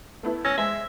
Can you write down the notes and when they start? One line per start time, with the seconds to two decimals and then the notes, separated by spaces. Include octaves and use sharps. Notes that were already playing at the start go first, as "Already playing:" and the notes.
0.23 A3 B3 E4
0.45 C#4 E6 G#6 A#6
0.58 G#3 G#4 C5 E5